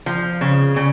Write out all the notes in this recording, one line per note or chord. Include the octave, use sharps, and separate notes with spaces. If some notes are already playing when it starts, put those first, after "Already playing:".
F3
C#3
C#3